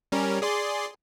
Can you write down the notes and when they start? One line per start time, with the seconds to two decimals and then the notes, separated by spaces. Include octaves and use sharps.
0.12 G3 C#4 A#4
0.42 G#4 D5 C6